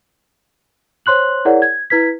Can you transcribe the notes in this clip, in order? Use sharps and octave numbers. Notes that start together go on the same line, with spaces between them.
C5 C#5 C6 F#6 F#7
E4 G#4 A#4 C#5 D5 F#5
G#6
E4 B4 G#6 B6